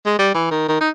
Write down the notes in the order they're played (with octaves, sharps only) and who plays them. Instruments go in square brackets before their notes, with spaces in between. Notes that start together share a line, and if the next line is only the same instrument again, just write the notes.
[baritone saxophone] G#3
G3
E3
D#3
D#3
D#4